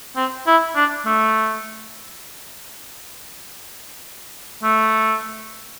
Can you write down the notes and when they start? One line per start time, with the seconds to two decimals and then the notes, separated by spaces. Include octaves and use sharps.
0.16 C4
0.47 E4
0.76 D4
1.06 A3
4.63 A3